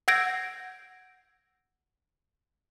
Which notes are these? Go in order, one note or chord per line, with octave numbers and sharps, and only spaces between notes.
F#5 E6 G6 G#6 A#6 D7